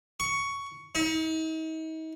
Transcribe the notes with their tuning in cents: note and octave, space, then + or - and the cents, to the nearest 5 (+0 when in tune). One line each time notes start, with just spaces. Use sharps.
C#6 +10
D#4 +40